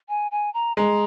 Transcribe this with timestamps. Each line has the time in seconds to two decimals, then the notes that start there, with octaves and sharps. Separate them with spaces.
0.09 G#5
0.31 G#5
0.54 A#5
0.77 G#3 A#5